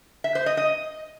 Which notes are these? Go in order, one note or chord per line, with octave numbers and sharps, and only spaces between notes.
E5
C5
D#5
D#5